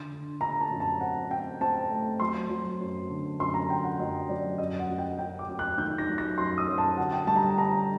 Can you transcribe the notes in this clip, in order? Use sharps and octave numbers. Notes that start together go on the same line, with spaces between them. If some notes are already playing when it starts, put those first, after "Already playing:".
Already playing: D3 C6
D3
D3 A#5
A5
F#2
A5
C4 F#5
C4 G5
C4 A5
A3
F#3 C6
F#3
F#2
D3
F#2 C6
A#5
D3 G5
F#5
F#2 D#5
F#3 D5
F#2 D#5
F#5
F#2
G5
F#2 G5
D6
F#2
F#6
D#3 G6
A#6
F#3
A#6
F#2 C6
D#6
F#2
A5
D3 F#5
G5
G3 A5
A#5
A5
D3 A#5